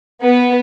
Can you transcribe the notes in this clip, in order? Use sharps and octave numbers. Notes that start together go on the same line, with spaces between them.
B3